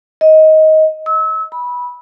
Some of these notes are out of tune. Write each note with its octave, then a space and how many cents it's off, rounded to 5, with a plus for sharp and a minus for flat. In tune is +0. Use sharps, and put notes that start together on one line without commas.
D#5 +15
E6 -30
B5 -15